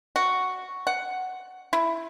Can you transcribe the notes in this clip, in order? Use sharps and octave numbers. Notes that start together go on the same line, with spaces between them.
F#4
F#5
E4